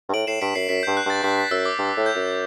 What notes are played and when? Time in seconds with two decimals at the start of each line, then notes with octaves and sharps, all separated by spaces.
0.09 G2
0.14 A2 D7 F#7
0.27 A2 C7 E7
0.41 G2 B6 D7
0.55 F#2 C7
0.69 F#2 B6
0.83 G2 G6
0.97 F#6
1.06 G2 A6
1.23 G2 B6
1.38 B6
1.51 F#2 E6
1.66 D6
1.79 G2
1.97 A2
2.06 G6
2.15 F#2